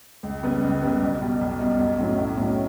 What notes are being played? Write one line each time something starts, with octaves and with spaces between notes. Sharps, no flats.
C#2
C#3 G3 B3
C#2
C#3 G3 B3
B1
B2 G3
B1
B2 G3
B1
A2 F#3 C#4
B1
A2 F#3 C#4